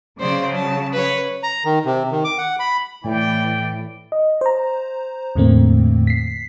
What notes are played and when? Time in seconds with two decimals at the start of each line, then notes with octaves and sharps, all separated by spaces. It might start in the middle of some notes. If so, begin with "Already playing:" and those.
0.19 C#3 F#3 C5 D5
0.55 A5
0.93 B4 C#5
1.43 A#5
1.65 D#3
1.85 C3
2.11 D#3
2.24 D6
2.38 F#5
2.60 B5
3.04 A2 E3 D5 G5
4.12 D#5
4.41 C5 A#5
5.36 E2 A2 D3 A3 A#3 C4
6.07 B6 C7